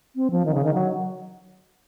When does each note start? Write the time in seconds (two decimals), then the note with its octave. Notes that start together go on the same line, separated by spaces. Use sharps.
0.16 C4
0.31 F3
0.45 D#3
0.54 C#3
0.64 D#3
0.74 F#3